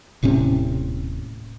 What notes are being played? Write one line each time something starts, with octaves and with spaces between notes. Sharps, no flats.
D#1 A2 C3 C#4